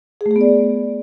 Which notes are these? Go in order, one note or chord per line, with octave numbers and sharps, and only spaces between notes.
G#4
A3
G#4
B3
D5